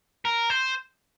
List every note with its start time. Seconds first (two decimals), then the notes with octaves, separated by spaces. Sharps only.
0.25 A#4
0.50 C5